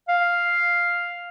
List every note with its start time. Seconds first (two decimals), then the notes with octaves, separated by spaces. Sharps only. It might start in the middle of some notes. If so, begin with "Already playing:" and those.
0.09 F5